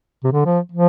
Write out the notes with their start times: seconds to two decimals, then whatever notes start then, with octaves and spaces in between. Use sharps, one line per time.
0.24 C3
0.32 D3
0.45 F3
0.71 F3